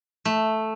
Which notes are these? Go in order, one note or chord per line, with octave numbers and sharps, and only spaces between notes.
A3